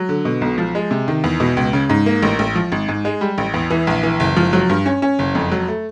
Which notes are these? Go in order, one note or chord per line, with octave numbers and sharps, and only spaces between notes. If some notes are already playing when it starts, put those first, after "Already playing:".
Already playing: F#3
D3
B2
B1
F3
G#3
C3
D#3
E2
B2
C#2
C#3
G#2
A#3
A1
A1
F3
G#1
G#2
G#3
G3
A1
E2
E3
A#1
E3
F#1
F3
F#3
G2
C#4
C#4
F#1
F2
F#3
A3